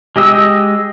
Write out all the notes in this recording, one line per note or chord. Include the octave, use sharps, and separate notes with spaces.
G#3 G4 D#5 E6